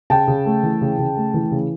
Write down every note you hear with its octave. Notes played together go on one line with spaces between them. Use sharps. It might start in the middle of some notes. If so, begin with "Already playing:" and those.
C#3 G5 A5
C#3
A3
E3
C#3
C#3
A3
E3
C#3